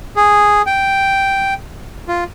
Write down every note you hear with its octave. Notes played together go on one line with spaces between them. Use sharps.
G#4
G5
F4